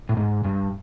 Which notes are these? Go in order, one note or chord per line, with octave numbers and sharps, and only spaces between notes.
A2
G#2
G2